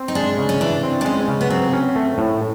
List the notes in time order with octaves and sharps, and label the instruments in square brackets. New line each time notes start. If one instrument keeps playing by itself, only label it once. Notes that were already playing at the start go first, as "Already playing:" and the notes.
Already playing: [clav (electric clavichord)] C4
[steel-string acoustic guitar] D#4
[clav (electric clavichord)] G#3 [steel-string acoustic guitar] D4
[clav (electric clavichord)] C#3
[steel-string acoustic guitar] C#4
[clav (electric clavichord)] E3 [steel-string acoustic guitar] D4
[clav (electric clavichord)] C4
[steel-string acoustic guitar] D4
[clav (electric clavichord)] G#3 [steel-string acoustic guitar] C#4
[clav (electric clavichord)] C#3
[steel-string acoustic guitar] B3
[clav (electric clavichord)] F#3 [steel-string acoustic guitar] C4
[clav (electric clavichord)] C#4
A3
A2